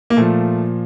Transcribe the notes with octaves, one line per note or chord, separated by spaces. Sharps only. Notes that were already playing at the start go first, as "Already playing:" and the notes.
A#3
A#2 F3 A3